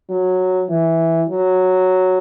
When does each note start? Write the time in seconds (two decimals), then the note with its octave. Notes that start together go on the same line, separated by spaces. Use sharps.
0.10 F#3
0.69 E3
1.29 F#3